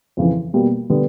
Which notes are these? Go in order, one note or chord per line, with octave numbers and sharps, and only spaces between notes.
F2 C#3 E3
B2 G3 A#3
D3 G3 B3